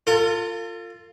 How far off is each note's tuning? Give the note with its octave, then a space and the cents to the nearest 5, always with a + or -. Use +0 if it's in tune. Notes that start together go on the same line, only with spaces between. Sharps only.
F4 +0 A4 +45